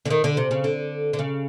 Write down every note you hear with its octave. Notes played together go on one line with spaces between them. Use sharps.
D3
D#3
D3
C3
C#3
D3
D3
C#3